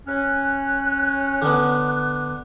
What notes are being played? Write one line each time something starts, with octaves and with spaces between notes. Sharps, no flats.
C#4 F#6
D3 B3